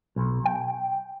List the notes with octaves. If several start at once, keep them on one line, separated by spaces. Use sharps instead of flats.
B1
G5